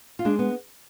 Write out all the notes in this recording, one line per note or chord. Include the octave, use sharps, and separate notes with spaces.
F4
G#3 D4
B3